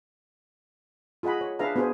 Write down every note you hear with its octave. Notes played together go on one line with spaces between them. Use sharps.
F4 G#4 D#5 F#5 B5
C#5
D4 G#4 B4 E5 F5 A#5
B3 D4 F#4 G#4 C5